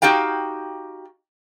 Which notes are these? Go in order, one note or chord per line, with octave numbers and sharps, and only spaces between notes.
D#4 F#4 G4 F5 G5